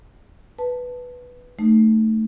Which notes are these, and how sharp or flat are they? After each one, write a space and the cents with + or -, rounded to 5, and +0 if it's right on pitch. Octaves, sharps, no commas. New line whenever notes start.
B4 +0 A5 +0
A3 +0 D#4 -25